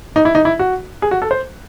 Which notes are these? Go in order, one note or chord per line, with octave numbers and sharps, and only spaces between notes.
D#4
E4
D#4
E4
F#4
G#4
F#4
A4
C5